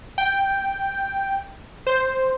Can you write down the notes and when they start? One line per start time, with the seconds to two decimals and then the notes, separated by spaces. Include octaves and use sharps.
0.18 G5
1.87 C5